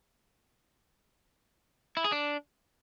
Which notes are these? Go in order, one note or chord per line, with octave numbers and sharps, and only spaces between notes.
E4
G#4
D4